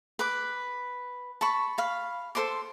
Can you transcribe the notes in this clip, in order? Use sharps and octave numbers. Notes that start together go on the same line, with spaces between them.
B4 D6
A5 B5 C#6
F5 B5
A4 C5 C6 D6